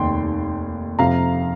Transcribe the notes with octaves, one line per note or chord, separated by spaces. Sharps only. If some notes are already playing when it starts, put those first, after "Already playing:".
Already playing: F1 D#2 D#3 G5 C6
F2 C3 F3 F5 A#5